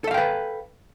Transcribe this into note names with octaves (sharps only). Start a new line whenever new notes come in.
A4 B4 E5 F5 G5